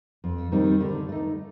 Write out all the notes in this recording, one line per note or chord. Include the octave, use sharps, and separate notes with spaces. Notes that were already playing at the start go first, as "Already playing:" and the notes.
F2
D#3 G3 C4 D#4
D3
A3 D#4